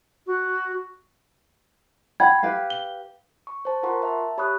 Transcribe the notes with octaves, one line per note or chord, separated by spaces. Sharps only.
F#4
F#5 G5 B5 G#6
G4 B4 F5
G7
C#6
C5 A5
F4 A#4 F#5 A#5 C6 C#6
E5 A5
G4 C#5 B5 C#6 D#6 F#6